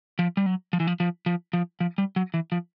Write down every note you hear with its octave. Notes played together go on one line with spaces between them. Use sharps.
F3
G3
F#3
F3
E3
F3
F3
F3
F3
F3
G3
F#3
E3
F3